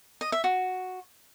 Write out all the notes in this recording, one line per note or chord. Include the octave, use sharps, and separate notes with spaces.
D#5
E5
F#4